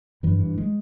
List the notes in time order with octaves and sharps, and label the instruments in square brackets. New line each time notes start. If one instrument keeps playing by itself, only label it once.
[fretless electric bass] G2 E3
G2
G#3